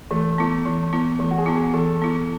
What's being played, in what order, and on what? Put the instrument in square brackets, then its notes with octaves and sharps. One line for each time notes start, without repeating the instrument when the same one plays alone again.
[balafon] E3 [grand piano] A3
[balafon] B3 E4
E3
B3 E4
[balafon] E3 [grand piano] A3
[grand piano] F#4
G#4
[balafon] B3 E4
[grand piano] G#4
[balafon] E3 [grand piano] A4
[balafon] B3 E4